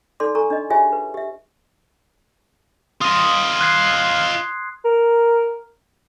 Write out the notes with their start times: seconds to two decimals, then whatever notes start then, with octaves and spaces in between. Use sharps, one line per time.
0.20 D#4 A4 D5 C6 D6
0.35 A4 G#5 A#5 C#6
0.50 D4 D#5
0.70 F4 G4 G#4 C#5 E5 G#5
0.92 B4
1.14 G4 E5
3.01 F4 D#5 C6 D#6
3.61 F#6 G#6 C7
4.85 A#4